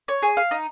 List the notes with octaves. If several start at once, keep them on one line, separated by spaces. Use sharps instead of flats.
C#5
G#4
F5
D#4